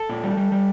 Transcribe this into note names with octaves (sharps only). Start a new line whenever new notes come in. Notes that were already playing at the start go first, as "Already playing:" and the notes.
Already playing: A4
A#2
G3
G3
G3